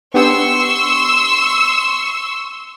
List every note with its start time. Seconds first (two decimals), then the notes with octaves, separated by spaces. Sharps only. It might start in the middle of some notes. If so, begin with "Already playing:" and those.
0.14 B3 D4 G4 C6 C#6 E6